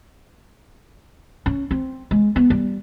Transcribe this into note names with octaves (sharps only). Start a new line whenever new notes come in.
C#4
C4
G#3
B3
G3